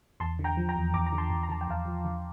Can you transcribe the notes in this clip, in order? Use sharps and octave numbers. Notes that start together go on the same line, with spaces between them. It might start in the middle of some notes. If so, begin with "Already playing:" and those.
E2 A5 C6
D3
G5 A#5
F3
G5 A#5
E2
E2 A#5 D6
A#5
D3
A5 C6
E2
A#5
D3 A5
G5
E2 F5 A5
F3
D3